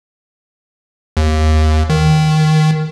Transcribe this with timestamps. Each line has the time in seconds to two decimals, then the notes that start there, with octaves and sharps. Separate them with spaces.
1.17 D#2
1.90 D#3